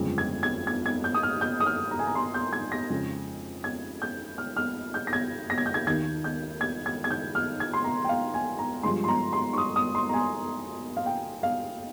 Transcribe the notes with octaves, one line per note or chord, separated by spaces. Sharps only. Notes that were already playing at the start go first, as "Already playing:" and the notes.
Already playing: G1 F2 C#3 G#3
G#6
G#6
G#6
G#6
G6
D#6
F6
G6
D#6
F6
A#5
G#5
A#5
C6
G6
G#6
A#6
F2 C#3 G#3
G#6
G6
F6
F6
G6
A#6
G#6
A#6
G#6
G6
G#6
D#2 D#3 A#3 G#6
G6
G#6
G#6
G#6
G6
F6
G#6
C6
A#5
G5
F5
G#5
A#5
G2 F3 G#3 C6
C6
A#5
C6
C#6
D#6
D#6
C6
A#5
G#5
F5
G5
F5